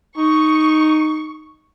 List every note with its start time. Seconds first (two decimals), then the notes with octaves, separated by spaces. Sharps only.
0.17 D#4 C#6